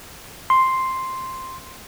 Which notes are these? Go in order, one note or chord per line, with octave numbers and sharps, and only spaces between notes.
C6